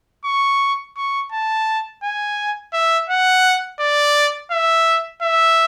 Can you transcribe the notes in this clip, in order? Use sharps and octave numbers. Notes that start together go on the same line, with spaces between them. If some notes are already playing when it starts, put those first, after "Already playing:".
C#6
C#6
A5
G#5
E5
F#5
D5
E5
E5